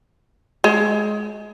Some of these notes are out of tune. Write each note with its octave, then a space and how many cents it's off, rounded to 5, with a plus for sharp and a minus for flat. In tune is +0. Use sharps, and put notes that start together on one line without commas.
G#3 +20